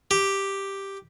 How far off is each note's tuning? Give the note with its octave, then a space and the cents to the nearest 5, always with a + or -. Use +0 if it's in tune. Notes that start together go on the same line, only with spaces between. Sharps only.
G4 +0